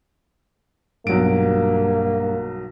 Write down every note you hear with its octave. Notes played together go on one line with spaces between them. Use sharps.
B1 G2 F#3 A#3 D7